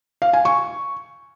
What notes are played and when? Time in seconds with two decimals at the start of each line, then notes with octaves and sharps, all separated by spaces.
0.22 F5
0.33 G#5
0.45 C#6